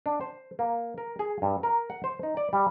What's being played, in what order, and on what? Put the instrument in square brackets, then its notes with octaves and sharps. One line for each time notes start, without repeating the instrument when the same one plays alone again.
[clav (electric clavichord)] D4
C5
A#3
A#4
G#4
G2
A#4
F#5
C5
D#4
D5
G3